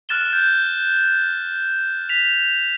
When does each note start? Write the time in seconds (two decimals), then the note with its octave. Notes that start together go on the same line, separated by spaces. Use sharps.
0.09 F6 F#6 A6 E7 G7
0.33 G6
2.09 B6 F7